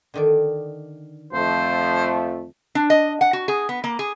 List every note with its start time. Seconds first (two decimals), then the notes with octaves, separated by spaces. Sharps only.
0.14 D3 D#3 D5
1.33 F2 F3 A3 C5
2.75 D4
2.90 D#5
3.21 F#5
3.33 F#4
3.48 G#4
3.69 B3
3.84 A#3
3.99 G#4